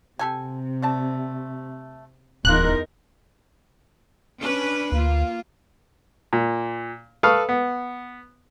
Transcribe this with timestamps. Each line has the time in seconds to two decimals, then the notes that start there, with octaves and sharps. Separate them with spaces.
0.19 C3 G4 A4 G#5
0.82 A3 D5 A5
2.45 D1 E2 D#3 A#3 D#4 F4 A#4 F#6
4.41 C#4 D4 B4
4.92 D2 A#3 F4
6.33 A#2
7.23 A4 B4 F5 C#6 D#6
7.49 B3